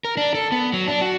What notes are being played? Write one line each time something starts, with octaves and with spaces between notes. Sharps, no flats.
A#4
D4
A4
B3
F#3
D4
F#4